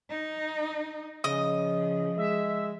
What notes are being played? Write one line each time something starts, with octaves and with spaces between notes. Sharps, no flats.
D#4
C#3 F3 D#5
G#3 E5